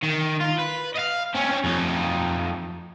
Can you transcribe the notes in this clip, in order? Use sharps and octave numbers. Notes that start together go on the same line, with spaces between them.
D#3
F4
B4
D#5 F5
C4 C#4
F2 D#4